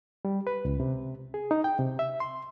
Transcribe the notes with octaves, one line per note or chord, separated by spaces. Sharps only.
G3
B4
C#2
C3
G#4
D#4
G5
C3
E5
C6